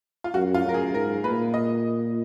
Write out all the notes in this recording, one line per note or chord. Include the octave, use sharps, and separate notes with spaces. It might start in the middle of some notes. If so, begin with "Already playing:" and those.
F4
F#2 F#4
F4
F#2 A#4
G#4
G#2 A#4
A#2 B4
D#5